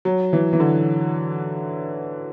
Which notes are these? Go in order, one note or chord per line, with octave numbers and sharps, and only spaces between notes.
F#3
E3
E3
D3